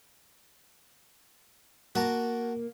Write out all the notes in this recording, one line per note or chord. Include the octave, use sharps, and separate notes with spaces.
A#3 F#4 A5 A#5